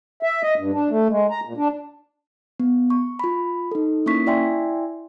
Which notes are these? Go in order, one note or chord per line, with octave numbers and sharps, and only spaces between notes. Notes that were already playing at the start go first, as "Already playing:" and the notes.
E5
D#5
G2
D4
A3
G#3
A#5
A#2
D4
B3
C#6
F4 B5
D#4 A4
A#3 C#4 E4 C#6 B6
E4 D5 E5 G5 G#5 C6